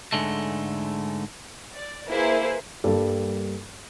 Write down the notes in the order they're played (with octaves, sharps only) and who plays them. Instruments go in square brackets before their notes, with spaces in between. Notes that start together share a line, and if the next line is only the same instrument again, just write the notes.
[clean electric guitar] G#2 D3 G#3 A3
[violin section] D5
A#3 E4 G#4 B4 C5
[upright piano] G2 G3 A#3 A4